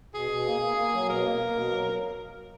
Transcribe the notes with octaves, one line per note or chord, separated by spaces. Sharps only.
B2 G#4
B2
A#3
A#3
A#3
F#3
B2 A#4
A#3
A#3
B2
F#3